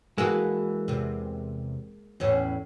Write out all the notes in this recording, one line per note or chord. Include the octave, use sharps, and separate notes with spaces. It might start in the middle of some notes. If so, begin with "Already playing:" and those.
E3 G#3 A#3 F#4 A4
E2 C3
E2 A2 C#4